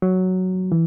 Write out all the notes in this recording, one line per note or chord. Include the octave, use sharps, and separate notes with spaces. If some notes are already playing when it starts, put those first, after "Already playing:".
F#3
E3